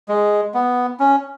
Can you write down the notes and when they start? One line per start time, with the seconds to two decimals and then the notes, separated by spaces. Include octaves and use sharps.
0.09 G#3
0.54 B3
1.00 C#4